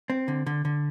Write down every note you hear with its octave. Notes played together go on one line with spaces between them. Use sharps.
C4
D3
D3
D3